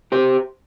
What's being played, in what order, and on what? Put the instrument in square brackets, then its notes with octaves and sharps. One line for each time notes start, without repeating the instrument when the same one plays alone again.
[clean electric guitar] G4 C5